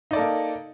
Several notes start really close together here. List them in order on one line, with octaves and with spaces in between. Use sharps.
D#4 D5 A4 A#3